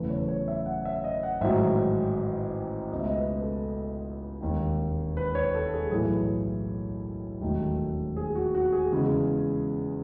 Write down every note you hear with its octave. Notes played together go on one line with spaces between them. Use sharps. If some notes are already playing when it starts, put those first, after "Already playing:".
Already playing: F#1 E2 C#3 E3 A3 B4
C#5
C#5
E5
F#5
E5
D#5
F#5
A1 G#2 D#3 F#3 E5
C#2 B2 A3 D#5
E5
D#5
B4
A4
E1 D#2 D#3
B4
C#5
A4
G#4
B1 A2 E3 G#4
E1 D#2 D#3 F#3 A3
G#4
F#4
F#4
G#4
E2 C#3 G#3